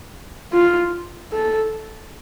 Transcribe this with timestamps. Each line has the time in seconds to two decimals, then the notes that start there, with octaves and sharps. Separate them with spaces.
0.53 F4
1.32 A4